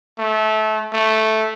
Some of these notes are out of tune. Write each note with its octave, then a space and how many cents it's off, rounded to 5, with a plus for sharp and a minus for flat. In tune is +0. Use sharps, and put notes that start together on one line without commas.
A3 -25
A3 -5